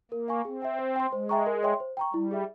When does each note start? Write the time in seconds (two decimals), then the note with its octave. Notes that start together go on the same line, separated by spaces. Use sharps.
0.11 A#3 A#4
0.28 F5 G#5 C#6
0.45 C4 G#4
0.62 E5 G5
0.79 C5
0.96 G5 C6
1.13 G#3 C5
1.29 E5 G5 A#5 C#6
1.46 A#4
1.63 C#5 E5 G5 C6
1.80 C5
1.97 G5 A#5 C#6
2.14 G3 E4
2.31 G#4 E5